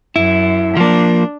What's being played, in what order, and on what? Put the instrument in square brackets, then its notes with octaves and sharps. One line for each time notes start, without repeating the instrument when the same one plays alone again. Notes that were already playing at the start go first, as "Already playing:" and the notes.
[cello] F#2 [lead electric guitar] E4
[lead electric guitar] F3 A#3 [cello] D4